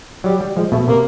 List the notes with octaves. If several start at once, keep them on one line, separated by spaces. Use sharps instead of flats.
F#3 G3
G3
F3 G#3
B2 A3
C3 A#3